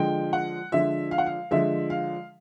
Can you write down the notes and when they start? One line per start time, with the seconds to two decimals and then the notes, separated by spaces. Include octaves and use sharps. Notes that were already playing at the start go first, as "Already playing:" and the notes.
Already playing: D3 F3 G#3 G5
0.33 F#5
0.72 D3 F3 G#3 E5
1.11 F5
1.18 F#5
1.26 F5
1.51 D3 F3 G#3 E5
1.90 F5